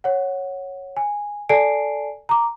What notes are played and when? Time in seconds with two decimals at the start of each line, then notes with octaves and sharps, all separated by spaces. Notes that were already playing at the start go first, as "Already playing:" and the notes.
0.04 C#5 F#5
0.97 G#5
1.49 A4 D5 G#5 A5 C7 D7
2.29 A#5 D6